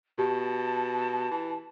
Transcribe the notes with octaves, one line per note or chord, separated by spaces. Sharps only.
B2 G4 A5
E3